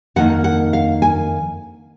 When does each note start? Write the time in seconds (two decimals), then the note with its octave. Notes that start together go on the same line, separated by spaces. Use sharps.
0.16 F2 D#3 A#3 D#4 F#5
0.44 F#5
0.73 F5
1.02 G#5